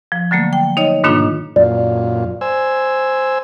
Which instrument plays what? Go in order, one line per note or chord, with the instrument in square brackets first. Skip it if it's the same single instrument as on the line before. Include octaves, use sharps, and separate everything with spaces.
[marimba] F3
D3 F#3 A3 A#3
G5
D#4 C#5 D#5
G#2 B2 D#3 A#3 D4 F4
[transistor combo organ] F#2 A#2 F4 [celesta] D5
[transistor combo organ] C5 G#5 E6